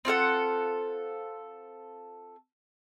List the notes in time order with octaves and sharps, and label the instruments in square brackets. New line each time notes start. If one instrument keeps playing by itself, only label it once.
[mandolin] C4 F4 A4 F#5